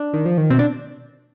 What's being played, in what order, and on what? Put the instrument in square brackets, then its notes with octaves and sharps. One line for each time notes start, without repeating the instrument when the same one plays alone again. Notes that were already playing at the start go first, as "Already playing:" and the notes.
Already playing: [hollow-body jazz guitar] D4
[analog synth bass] D#3
F3
D#3
[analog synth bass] B2 [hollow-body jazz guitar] C4
[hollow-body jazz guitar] D4